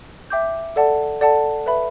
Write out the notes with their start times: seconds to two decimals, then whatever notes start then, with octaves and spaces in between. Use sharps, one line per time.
0.30 E5 G5 D6 G6
0.76 A4 D5 F#5 A5
1.21 A4 D5 F#5 A5
1.66 B4 E5 B5